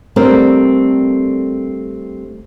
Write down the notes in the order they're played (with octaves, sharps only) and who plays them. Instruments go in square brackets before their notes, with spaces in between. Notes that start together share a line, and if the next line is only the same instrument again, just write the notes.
[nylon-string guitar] G3 A3 C4 D4 A4 A#4